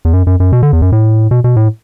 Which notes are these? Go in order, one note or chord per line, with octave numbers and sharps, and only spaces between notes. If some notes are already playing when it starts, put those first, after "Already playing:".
E2
F#2
F#2
F#2
B2
D3
E2
F#2
A2
B2
B2
A2